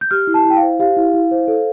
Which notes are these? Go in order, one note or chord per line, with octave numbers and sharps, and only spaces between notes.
G6
G4 F6
E4
A5
E4 G5
C5 F5
G4 F5
E4
E4
C5
A4